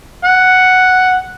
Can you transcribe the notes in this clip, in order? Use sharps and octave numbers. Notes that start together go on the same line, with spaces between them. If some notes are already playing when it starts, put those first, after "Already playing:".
F#5